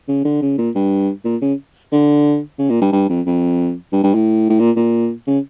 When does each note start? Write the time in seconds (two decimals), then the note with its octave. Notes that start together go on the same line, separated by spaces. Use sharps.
0.08 C#3
0.25 D3
0.42 C#3
0.58 A#2
0.75 G2
1.25 A#2
1.42 C#3
1.92 D3
2.59 C#3
2.70 A#2
2.82 G2
2.93 G2
3.09 F2
3.26 F2
3.93 G2
4.04 G2
4.15 A2
4.50 A2
4.60 A#2
4.76 A#2
5.27 C#3